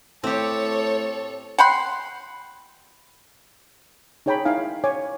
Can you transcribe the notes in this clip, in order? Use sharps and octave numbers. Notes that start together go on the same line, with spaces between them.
A2 C4 G4 A4 C#5
F#5 G5 B5 C6
D#4 G#4 C#5 G5 A#5 B5
D#4 E4 F5 G#5
C#5 G#5 D6